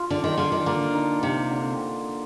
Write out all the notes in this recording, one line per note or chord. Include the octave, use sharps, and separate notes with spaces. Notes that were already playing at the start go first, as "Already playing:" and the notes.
Already playing: F4
D3 D4
D#3
D3 F4
D#3
D3 A#3
D#4
C3 A#3
D3